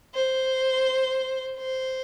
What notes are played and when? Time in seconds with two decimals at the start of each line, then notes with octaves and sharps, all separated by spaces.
0.15 C5
1.58 C5